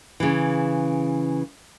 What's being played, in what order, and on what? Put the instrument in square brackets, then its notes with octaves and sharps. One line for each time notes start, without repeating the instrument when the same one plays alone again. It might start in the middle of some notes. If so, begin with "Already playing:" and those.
[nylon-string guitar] C#3 E3